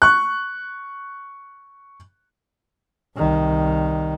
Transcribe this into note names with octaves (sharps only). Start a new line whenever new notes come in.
C#6 F#6
C2 D#3